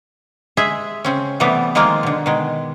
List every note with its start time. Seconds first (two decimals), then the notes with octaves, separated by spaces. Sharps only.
0.57 G#3 G#4 E5
1.05 C#3 C4 C#4
1.40 C3 E3 G3 A3 B3
1.75 D#3 F3 G#3 A#3 F4
2.03 B2 D3
2.26 B2 D#3 G#3